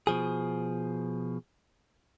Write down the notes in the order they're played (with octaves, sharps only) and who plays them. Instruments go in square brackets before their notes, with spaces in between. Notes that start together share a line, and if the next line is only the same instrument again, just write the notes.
[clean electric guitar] B2 F3 G#4